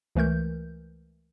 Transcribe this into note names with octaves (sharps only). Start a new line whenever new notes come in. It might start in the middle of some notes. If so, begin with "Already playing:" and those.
C#2 E3 A3 A#4 G6